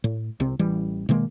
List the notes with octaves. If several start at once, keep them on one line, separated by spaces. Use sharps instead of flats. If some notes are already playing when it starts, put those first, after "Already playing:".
A2
C2 C3 C4
A1 E3 G3
B2 D#3 G#3 A#3